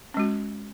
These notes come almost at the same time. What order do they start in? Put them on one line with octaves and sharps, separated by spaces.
C#4 G#3 F#4